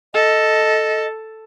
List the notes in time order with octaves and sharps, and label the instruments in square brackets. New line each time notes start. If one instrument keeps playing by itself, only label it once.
[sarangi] A4 [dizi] D#5